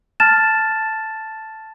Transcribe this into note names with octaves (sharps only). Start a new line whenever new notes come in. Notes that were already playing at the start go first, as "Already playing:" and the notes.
A5 F6 A6 E7